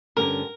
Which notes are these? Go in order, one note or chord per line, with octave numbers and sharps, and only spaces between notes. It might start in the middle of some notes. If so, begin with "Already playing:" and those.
G2 D3 G3 C#4 A#4